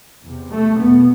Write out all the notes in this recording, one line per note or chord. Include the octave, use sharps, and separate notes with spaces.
E2 C3
A3
E2 B2 B3